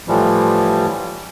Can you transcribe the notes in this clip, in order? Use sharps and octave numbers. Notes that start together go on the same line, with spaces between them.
A2 E3 F3 G3